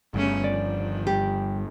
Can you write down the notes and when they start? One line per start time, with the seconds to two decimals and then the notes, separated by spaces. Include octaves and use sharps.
0.14 G1 G2 C#3 A3 C#4
0.44 D#3 F3 D5
1.07 G3 G4